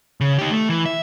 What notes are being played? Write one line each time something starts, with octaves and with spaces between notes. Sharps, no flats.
C#3
D#4 G4
A3
E3
E5